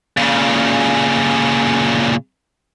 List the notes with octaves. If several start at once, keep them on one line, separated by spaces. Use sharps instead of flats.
A#2 C#3